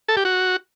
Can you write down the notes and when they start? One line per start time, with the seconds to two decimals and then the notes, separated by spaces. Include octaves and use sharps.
0.08 A4
0.17 G4
0.25 F#4